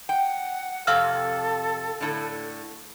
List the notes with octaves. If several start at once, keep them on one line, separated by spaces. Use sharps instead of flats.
F#5 G5
F2 C3 A4 F5 E6 F6
A2 D3